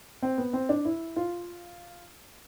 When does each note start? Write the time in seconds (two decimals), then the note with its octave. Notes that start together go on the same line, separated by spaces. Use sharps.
0.23 C4
0.38 B3
0.53 C4
0.69 D4
0.85 E4
1.16 F4